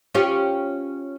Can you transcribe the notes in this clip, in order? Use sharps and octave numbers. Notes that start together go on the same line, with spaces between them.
C#4 F4 G4